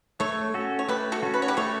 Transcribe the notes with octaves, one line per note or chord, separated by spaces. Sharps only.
A3 A4 C#5
C#4 F#4 A4
C#5
A3 G4 B4
F#4 A4
C#4 F#4 A4
B4
C#5
G4 B4
A3 A4 C#5